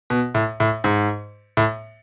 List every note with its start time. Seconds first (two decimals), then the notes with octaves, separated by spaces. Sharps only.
0.10 B2
0.35 A2
0.60 A2
0.84 G#2
1.57 A2